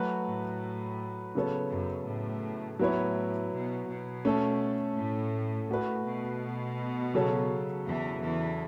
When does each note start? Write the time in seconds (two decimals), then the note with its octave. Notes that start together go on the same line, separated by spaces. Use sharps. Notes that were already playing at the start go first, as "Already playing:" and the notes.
Already playing: F#3 A3 F#4 B4
0.26 A2
1.35 C#3 F#3 B3 A4 C#5
1.71 F#2
2.08 A2
2.79 A2 F#3 B3 E4 C#5
3.53 B2
3.88 B2
4.25 A3 C#4 A4
4.97 A2
5.69 A2 A3 F#4 B4
6.05 B2
7.14 C#3 F#3 C#4 A4 C#5
7.86 E2 E3
8.22 E2 E3